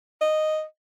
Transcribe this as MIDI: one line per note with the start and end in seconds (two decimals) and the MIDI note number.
0.21 0.63 75